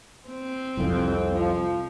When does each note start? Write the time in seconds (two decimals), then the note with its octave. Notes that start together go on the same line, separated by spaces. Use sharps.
0.29 C4
0.77 C2 F2
1.34 F3